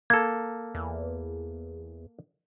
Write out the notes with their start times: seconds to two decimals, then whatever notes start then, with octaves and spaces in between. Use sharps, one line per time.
0.10 A#3 A4 G#6
0.75 E2